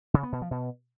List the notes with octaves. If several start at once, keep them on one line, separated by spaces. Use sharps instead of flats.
C#3
B3
B2
F3
B2